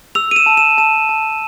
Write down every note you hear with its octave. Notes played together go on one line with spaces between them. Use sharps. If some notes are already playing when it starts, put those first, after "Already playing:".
E6 F7
D#7
E7
A5
E7
A5 E7
A5